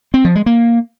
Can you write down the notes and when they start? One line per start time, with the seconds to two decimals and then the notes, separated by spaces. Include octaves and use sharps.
0.14 C4
0.25 F3
0.35 G#3
0.46 A#3